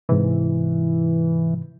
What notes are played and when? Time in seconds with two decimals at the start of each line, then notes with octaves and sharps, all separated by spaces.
0.09 G#2 C3 E3